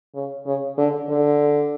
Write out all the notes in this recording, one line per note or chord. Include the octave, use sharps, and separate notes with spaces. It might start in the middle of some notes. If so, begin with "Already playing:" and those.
C#3
C#3
D3
D3